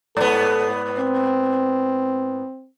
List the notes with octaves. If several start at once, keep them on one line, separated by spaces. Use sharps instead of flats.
G#2 B3 A4
C4